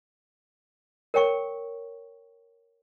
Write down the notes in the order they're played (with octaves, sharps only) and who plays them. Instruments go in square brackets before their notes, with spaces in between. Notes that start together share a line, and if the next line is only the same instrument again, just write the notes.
[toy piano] A#4 C#5 G5 C#6